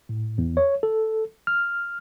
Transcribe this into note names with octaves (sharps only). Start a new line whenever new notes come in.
A2
E2
C#5
A4
F6